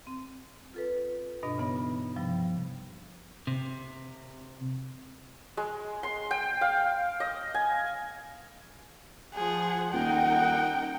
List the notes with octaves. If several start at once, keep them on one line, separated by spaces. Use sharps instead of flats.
C4
F4 A4 B4
G2 B2 D4 D#5
C#3 E3 B3 D#4
G2 C3 F3 G3
C3
G#3
C6
G5
F5
D#5
G#5
F3 G#4 F#5
D#1 D#4 A#4 F#5 G5